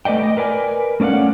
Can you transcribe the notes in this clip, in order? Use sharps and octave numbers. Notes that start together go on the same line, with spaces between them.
A3 B4 D5 D#5 G5
D#5
A#4 B4 D5 G#5
A3 C#4 D5 F5 F#5